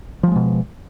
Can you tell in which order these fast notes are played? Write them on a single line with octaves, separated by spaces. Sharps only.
F3 G3 G#3 B2